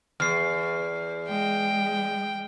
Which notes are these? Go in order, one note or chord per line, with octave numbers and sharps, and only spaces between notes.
E2 F6 C7
G#3 G5